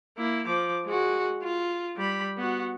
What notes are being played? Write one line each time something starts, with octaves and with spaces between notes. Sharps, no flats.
A#3 E4
F3 D6
G#3 F#4
F4
G3 B5
B3 F#4